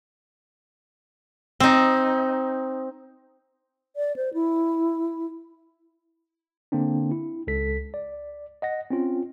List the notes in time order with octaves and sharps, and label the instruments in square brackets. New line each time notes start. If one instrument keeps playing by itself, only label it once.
[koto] C4 D#4
[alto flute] D5
C5
E4
[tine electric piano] D3 A#3 C4 D4
E4
C#2 A4 B6
D5
D#5 F#5 A#6
C4 C#4 F4